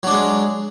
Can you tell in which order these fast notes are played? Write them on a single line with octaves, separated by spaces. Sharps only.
F#3 D4 G#3